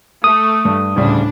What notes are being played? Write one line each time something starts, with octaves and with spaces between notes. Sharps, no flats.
A3 D#6
G2
D2 A2 C#3 G3 D4